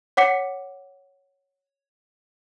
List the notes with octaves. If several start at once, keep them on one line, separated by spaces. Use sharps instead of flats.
C#5 F#5 D6 B6 C#7